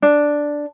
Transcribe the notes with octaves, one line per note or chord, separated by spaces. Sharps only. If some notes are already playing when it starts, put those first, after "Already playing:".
D4